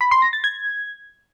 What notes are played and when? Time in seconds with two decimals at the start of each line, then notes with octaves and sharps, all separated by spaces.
0.01 B5
0.11 C6
0.22 A#6
0.33 A6
0.44 G#6